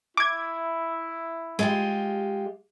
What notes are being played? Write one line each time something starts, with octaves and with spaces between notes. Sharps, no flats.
E4 D6 G#6
G#3 F4 G4